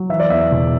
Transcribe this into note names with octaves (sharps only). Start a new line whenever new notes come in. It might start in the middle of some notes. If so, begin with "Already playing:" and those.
Already playing: F#3
E3 E5
D5
E2 E5
E1